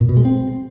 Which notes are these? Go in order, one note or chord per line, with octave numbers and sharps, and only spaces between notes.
A#2
B2
G#3
C4